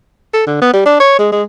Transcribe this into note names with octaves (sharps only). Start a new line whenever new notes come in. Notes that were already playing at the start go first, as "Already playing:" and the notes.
A4
D3
B3
G3
D4
C#5
G#3
G#3